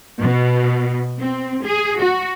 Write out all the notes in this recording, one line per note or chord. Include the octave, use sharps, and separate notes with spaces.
B2
C4
G#4
F#4